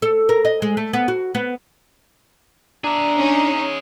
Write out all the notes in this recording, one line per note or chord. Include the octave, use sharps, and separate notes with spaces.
A4
A#4
D#5
G#3
A3
B3
F#4
B3
D4 G#4 E5 A#5
C#4 D#4